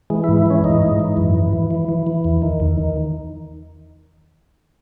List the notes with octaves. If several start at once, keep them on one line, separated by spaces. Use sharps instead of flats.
E3 G#3
E4
G#2
E4
E3 C#4
G#2 D#4
G#2
E3
F#2
E3
E3
E3
E3
E3
E2
D#3
E2
D#3